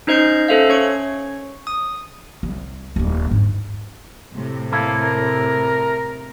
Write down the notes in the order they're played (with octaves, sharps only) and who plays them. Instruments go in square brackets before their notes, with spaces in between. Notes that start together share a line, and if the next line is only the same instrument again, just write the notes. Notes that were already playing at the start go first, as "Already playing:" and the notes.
[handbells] C#4 D#4 C5 D#5 G6 C7
C#4 A4 C5 E5 F5
C#4 C#5 C#6 C#7
D#6
[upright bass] C2
D#1 D4
G#2
[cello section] A2 C3
[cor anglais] A#3 [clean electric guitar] E4 A4
[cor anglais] A#4